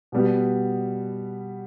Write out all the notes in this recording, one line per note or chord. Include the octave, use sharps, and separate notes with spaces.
B2 G3 B3